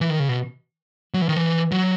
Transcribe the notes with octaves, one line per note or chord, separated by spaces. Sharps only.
E3
D#3
C#3
B2
F#3
E3
D#3
E3
F#3